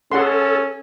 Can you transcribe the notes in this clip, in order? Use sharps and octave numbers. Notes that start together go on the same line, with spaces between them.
C#4 G#4 A4 F#5 C6